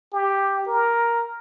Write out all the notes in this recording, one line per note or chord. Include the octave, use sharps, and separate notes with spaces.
G4
A#4